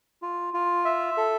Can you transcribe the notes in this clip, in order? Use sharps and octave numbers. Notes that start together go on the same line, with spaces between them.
F4
F4
E5
A4